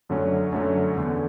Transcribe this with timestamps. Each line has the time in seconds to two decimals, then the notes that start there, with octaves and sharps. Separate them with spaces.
0.09 F#2 D3 F#3 A3 C#4
0.52 F#2 D3 F#3 A3 C#4
0.97 E2 D3 A3